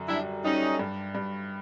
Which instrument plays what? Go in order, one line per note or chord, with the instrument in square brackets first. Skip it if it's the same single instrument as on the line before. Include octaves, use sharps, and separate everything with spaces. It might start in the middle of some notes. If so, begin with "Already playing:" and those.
Already playing: [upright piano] F#2 D3
[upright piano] G3 [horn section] D4 E4
[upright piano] G3 [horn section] C#4 D#4
[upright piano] G2
G2